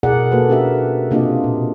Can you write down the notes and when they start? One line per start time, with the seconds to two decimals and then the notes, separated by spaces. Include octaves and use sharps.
0.03 B2 E4 G#4 A#4 D5 F#5
0.32 A#3 F#4 A4 B4
0.49 C#4 D4 F#4 G4 A#4 E5
1.11 C3 A#3 D4 F4 G4 D#5
1.44 A#2